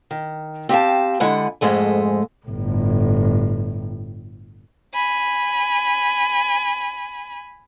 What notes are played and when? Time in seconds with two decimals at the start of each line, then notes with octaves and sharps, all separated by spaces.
0.11 D#3
0.69 C4 G4 F5 A5
1.20 D3 G#3 E4 F#5 G#5
1.61 F2 G#2 G#3 A3 G#5
2.46 G1 A2
4.94 G#5 B5